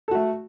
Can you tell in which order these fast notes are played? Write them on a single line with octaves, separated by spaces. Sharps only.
A4 F#4 A3